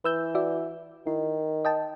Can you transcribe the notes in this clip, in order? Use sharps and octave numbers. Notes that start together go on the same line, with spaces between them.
E3 B4 E6 G6
F#4 D5 E5
D#3 E4
D#5 G5 A5